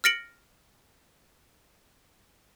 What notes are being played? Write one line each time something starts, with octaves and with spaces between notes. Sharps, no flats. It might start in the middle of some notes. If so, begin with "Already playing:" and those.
F6 A6 A#6 C#7 D7 F#7